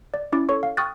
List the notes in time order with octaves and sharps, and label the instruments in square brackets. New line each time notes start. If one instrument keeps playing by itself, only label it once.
[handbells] D5
C#4 E4 D6 A6
A4 C#5 C#6
F5
G5 C#6 D#6 F6 F#6 A6